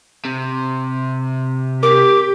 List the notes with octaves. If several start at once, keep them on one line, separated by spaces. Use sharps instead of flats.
C3
G4 A#4 D6